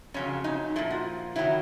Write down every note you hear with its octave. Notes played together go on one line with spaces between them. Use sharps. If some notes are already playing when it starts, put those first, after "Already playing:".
F2 C#3 F#3 C#4
D#4
A#2 F3 E4
F#4
D#3 F#3 E4